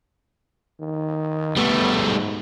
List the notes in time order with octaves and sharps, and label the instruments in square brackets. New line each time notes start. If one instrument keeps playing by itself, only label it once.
[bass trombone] D#3
[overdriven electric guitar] G3 A3 [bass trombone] B3
[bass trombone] G#2